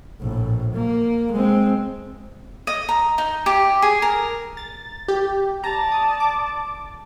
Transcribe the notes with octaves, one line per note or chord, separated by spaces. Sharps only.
A#1 A2
A#3
G#3 C4
D#5
A#5
D#4
G4
G#4
A#4
A6
G4
D5 A5 A#5
D#6
D6